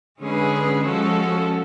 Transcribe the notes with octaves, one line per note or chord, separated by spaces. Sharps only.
D3 G#3 C#4 G#4 B4
F3 G#3 C#4 F#4 A4